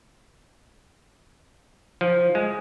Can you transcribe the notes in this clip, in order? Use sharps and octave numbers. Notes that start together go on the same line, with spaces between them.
F3
G#3